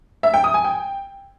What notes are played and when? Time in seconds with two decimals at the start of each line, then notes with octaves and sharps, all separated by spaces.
0.23 E5
0.34 G5
0.44 D#6
0.54 G#5
0.64 G5